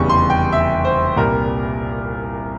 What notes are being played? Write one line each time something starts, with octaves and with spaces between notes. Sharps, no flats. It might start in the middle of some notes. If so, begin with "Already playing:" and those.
Already playing: F1 E2 C#3 G3 C#6
C6
G5
E5
C5
C2 A#2 G3 A#4